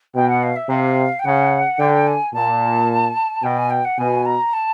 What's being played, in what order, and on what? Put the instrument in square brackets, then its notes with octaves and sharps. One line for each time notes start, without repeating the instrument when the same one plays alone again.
[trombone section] B2 [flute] G5
[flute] F#5
F5
E5
[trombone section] C3 [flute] F5
[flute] G5
[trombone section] C#3 [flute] F#5
[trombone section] D3 [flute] G5
[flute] G#5
[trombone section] A#2 [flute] A5
[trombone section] B2 [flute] G5
[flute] G#5
G5
F#5
[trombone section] B2 [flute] G#5
[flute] A#5
A5